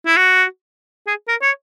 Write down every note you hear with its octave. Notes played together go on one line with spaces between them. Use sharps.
E4
F#4
G#4
A#4
C#5